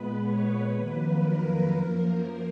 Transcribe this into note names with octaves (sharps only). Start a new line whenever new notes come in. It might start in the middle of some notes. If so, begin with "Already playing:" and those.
Already playing: A#2 G#3 B3 B4
C#5
F2 D#3 F#3 A#3 B4
A#4
F#2 F3 A#3